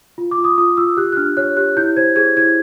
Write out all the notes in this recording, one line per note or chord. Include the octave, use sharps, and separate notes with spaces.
F4
D6
F4
D#6
F4 D#6
F4 E6
G4 F#6
F#6
D4 F6
C#5 F#6
G4 F#6
E4 G6
C5 G#6
G#4 G#6
E4 G#6